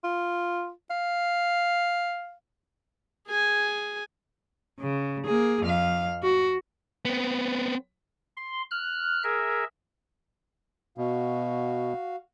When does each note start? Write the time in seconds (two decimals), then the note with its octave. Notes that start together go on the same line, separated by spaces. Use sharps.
0.04 F4
0.91 F5
3.28 G#4 G#5
4.80 C#3
5.26 A#3 G#4
5.63 F2 F5
6.23 F#4
7.05 B3 C4
8.37 C6
8.71 F6 F#6
9.24 G#4 A#4 E5
10.98 B2 F#4 F5